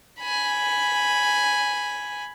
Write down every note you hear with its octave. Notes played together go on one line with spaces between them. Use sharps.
G#5 B5